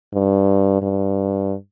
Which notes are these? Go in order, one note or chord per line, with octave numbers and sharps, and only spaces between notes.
G2
G2